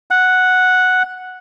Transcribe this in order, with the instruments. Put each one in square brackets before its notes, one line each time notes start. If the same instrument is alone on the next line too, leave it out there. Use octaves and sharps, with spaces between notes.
[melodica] F#5